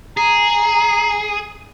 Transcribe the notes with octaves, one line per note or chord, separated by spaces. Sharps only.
G#4 A#5